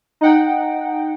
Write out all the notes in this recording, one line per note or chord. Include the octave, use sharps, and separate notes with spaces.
D#4 D#5 F#5 G5